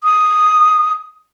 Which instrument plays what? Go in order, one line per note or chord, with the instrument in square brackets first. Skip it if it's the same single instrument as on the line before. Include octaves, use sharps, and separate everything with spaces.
[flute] D#6